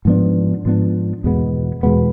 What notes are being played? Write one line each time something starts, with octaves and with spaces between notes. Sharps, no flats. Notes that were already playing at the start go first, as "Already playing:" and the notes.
G#2 F3 B3 D4
G#2 F3 B3 D4
E2 B2 G#3 B3
E2 B2 G#3 B3